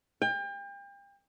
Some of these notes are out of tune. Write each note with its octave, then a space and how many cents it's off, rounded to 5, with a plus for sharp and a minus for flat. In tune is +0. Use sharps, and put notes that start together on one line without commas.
G5 +35